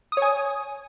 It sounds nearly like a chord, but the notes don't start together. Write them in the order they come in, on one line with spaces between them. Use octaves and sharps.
D#6 C#5 G#5